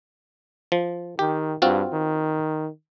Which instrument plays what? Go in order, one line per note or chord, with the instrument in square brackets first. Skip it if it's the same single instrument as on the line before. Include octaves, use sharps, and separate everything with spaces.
[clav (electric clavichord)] F3
[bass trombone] D#3 [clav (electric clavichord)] G4
[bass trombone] G2 [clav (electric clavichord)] C4 F4 F#4
[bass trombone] D#3